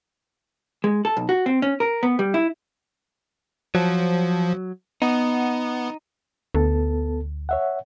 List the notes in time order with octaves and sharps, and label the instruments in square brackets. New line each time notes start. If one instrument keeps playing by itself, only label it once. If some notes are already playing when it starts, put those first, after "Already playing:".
[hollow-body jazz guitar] G#3
A4
B1
F#4
C4
C#4
A#4
B3
G3
E4
[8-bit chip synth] F3 [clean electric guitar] F#3
[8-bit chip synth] B3 [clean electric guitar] D#4
[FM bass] D2 [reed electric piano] B3 A4 A5
[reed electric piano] C#5 E5 F#5